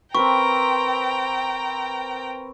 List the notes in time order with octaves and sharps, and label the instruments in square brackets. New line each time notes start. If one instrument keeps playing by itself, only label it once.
[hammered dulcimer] C4 A#4 B4 [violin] G5 A#5 [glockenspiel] C#6